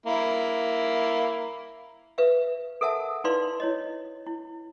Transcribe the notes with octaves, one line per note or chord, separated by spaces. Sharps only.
A#3 E4
B4 E5 F5
A4 A#4 E5 F#5 A5
D#4 E4 B4 D5 F5 C6
E4 C#5 D#5
E4